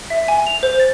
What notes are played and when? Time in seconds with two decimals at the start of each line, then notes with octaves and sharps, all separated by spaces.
0.10 E5
0.28 G#5
0.47 F7
0.63 C5
0.80 A6